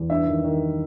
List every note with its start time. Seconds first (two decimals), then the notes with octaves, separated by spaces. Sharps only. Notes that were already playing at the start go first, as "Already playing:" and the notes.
Already playing: E2
0.10 G2 E5
0.27 D#3
0.44 D#3